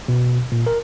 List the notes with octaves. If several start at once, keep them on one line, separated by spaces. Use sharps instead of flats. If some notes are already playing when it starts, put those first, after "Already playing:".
B2
A#2
A#4